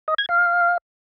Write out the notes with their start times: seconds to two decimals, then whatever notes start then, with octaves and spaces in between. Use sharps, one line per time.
0.08 D#5
0.18 G#6
0.29 F5